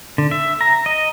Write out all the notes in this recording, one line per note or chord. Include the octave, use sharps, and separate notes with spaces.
D3
E5
A#5
D#5